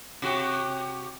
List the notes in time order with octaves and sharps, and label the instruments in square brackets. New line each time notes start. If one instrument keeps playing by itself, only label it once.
[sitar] C3 F#4 G4